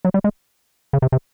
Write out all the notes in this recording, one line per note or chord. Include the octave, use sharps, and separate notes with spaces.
F#3
G3
G#3
C#3
C3
C3